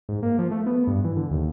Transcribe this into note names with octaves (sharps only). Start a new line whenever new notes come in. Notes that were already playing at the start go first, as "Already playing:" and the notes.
G#2
A#3
F3
A3
B3
G2
E3
D3
D#2